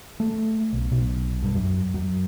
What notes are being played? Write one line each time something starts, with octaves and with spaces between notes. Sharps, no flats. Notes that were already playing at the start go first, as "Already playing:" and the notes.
A3
B1
B1
G2
F#2
F#2